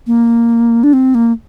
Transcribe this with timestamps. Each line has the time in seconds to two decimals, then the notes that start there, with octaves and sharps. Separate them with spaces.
0.07 A#3
0.83 D4
0.93 C4
1.15 A#3